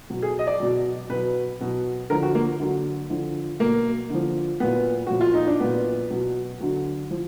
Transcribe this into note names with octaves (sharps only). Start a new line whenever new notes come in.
B2 F#3
G#4
D#5
D5
B2 F#3
B2 F#3 B4
B2 F#3
D3 F3 A#4
F#4
A#3
D3 F#3
D3 F3
B2 F#3 A#3
D3 F3
A#2 F#3 B3
A#2 F3 F#4
F4
D#4
D4
A#2 F#3 B3
B2 F#3
D3 F#3
F3